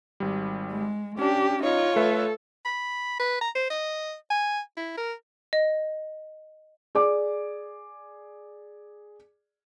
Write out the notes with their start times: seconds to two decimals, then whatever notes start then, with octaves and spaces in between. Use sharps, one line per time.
0.20 G#1 G3
0.71 G#3
1.19 C#4 D4 G4
1.63 D#4 F4 C#5
1.96 A3 A4 B4 E5
2.65 B5
3.19 B4
3.41 A#5
3.55 C5
3.70 D#5
4.30 G#5
4.77 E4
4.97 A#4
5.53 D#5
6.95 G#4 D5 D6